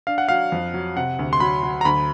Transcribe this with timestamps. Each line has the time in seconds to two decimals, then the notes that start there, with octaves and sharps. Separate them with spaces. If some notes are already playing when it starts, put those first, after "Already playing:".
0.07 D4 F5
0.18 F#5
0.29 F#3 F5
0.52 F2
0.74 F#3
0.96 C3 F#5
1.19 D2
1.33 C6
1.40 F#3 B5
1.63 F#3
1.81 A#5
1.85 D2 B5